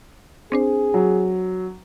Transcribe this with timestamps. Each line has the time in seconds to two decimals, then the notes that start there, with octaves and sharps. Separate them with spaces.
0.52 C4 D4 G#4 C5
0.94 F#3